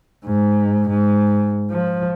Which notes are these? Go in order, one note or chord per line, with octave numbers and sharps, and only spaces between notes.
G#2
G#2
F3